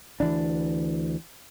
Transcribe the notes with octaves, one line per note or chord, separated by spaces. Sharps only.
D2 E3 D4